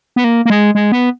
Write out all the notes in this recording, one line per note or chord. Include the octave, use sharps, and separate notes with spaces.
B3
A#3
A#3
G#3
G#3
B3